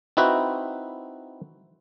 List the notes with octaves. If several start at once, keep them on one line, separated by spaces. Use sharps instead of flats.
C4 D#4 E4 F#4 B4